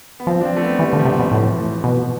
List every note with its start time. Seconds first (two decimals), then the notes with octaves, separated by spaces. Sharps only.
0.20 B3
0.27 F3 C4
0.41 D4
0.45 C4
0.57 A3
0.62 B3
0.79 E3 G3
0.93 D3
0.99 F3
1.05 C3 G3
1.19 B2
1.31 A2 E3
1.43 F3
1.54 E3
1.84 B2